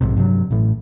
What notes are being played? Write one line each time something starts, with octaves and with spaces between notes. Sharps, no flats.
A#1 G#2 C3
G2 C3 F3 F#3
A1 A2